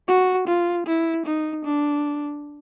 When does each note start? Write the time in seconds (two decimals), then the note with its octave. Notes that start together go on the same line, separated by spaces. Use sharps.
0.08 F#4
0.48 F4
0.87 E4
1.26 D#4
1.65 D4